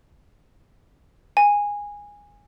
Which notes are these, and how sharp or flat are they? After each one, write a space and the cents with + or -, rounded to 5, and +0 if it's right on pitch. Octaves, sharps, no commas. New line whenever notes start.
G#5 -15